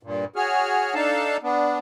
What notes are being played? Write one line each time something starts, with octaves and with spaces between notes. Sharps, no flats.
G2 A#2
F#4 G#4 C#5 F6
D4 D#4 A4 F5 A5
B3 D4